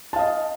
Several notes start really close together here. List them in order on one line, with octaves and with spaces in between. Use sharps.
A5 F5 D#5